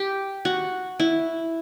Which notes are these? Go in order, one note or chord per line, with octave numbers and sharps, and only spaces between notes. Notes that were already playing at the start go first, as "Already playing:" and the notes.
Already playing: G4
F#4
E4